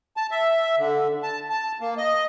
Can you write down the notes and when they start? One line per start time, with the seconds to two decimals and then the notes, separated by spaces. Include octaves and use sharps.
0.17 A5
0.31 E5
0.78 D3
1.23 A5
1.50 A5
1.81 A#3
1.98 D#5